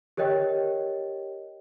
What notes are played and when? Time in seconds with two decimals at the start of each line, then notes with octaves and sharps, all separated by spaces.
0.17 G4 A#4 C#5 D#5 G5